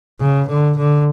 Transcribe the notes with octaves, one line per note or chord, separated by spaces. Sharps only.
C#3
D3
D3